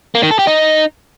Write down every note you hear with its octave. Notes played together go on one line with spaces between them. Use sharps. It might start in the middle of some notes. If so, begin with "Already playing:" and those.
A#3
D#3
A4
G4
D#4